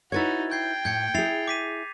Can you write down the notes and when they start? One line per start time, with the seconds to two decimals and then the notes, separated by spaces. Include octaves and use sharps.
0.12 D#4 E4 F#4 B4 C#5 G#6 A6
0.51 G5 G6 G#6 C7
0.85 A2 G6 G#6 C#7
1.14 E4 G#4 A6 C7 F7
1.48 D6 B6 D#7